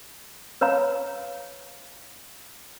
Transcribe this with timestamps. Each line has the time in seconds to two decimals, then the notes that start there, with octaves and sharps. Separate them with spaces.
0.61 B4 C#5 F5 A#5